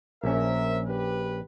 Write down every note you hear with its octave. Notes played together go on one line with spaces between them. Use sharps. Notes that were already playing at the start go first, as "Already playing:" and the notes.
A#1 C#4 A#4 C5 E5
G4 B4